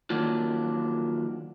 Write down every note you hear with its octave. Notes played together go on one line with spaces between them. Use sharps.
D#3 F#3 A#3 D4 F4